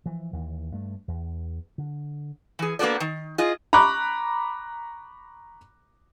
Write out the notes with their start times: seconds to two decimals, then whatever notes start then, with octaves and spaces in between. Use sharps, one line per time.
0.06 E3 F3
0.33 D#2 E3
0.72 G2 A3
1.08 E2
1.78 D3
2.59 E3 G#4
2.79 A#3 B3 D4 F#4 A4 D5
3.00 D#3
3.38 F4 G#4 D#5
3.73 A#5 B5 C#6 D6 F#6